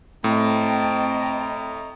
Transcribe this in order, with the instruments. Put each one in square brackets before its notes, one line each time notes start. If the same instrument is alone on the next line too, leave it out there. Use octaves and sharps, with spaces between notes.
[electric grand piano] A2 [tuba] C4 [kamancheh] D#5 A#5 [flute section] G5 A5